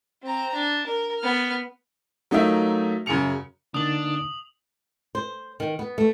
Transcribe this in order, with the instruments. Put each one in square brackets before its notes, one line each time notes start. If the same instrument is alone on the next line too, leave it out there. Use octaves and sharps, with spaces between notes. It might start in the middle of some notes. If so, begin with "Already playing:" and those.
[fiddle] C4 A#5
D4
A#4
B3 F6
[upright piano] F#3 A3 D#4 F4 A#4 E5
F#2 C#3 G#5 C#7 F7
[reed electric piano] D3 A#3 D#4 [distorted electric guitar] D4 [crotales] D#6 F#7
[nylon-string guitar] C5
D#3
B3
A3